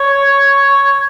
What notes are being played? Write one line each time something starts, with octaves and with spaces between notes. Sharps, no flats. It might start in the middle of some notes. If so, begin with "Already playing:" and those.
Already playing: C#5